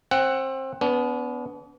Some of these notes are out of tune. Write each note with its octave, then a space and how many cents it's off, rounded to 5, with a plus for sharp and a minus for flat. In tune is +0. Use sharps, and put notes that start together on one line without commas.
C4 +25 F#5 +10
B3 +10 D4 -40